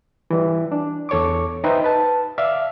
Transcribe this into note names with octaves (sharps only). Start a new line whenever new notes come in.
E3 G3
D4
E2 A4 C#5 C#6 D6
D#4 B4 C5 D#5 E5 G5
B4 A5
D5 E5 F5 F6